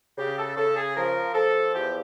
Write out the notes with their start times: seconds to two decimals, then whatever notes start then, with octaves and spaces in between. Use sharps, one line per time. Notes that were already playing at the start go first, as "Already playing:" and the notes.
0.18 C#3 G4
0.37 A4
0.56 C#3 A4
0.76 G#4
0.95 F3 A#4
1.34 F3 A4
1.74 E2 G4